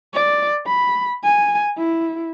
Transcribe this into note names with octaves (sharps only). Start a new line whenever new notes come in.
D5
B5
G#5
E4